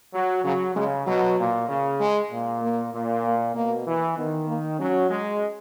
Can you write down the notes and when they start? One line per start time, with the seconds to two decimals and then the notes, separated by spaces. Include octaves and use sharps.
0.13 F#3
0.44 C#3 F#3
0.75 C#3 G#3
1.07 B2 F#3
1.38 A#2
1.68 C#3
2.00 G#3
2.30 A#2
2.62 A#3
2.93 A#2
3.24 A#3
3.54 B2 A#3
3.87 E3
4.17 D#3 B3
4.47 A#3
4.79 F#3 C#4
5.10 G#3